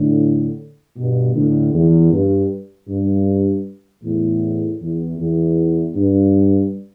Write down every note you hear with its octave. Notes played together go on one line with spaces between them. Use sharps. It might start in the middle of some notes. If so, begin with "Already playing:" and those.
Already playing: A2 D3
G2 B2
A2 D3
E2
G2
G2
E2 A2
E2
E2
G2